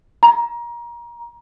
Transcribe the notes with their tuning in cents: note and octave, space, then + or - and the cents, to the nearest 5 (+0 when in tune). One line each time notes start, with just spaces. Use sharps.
A#5 +25